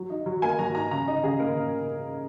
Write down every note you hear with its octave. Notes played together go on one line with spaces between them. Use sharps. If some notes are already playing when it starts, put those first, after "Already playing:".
Already playing: F#3
D#4
F#3
A#3 G#5
F#3 A#5
D#4 A#5
C#3 A#5
D#4 D#5
C#3 G#4
A#3 A#4
C#3